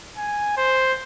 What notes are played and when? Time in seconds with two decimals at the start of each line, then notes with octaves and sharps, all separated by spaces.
0.17 G#5
0.57 C5